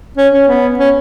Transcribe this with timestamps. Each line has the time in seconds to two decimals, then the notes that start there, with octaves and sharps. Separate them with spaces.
0.17 C#4
0.33 C#4
0.48 B3
0.79 C#4